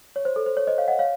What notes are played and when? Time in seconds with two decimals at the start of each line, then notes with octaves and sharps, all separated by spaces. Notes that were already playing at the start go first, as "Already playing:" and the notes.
0.16 C#5
0.25 C5
0.36 A4
0.46 C5
0.57 C#5
0.67 C5 D#5
0.78 C#5 F5
0.88 D#5 F#5
0.99 C#5 F5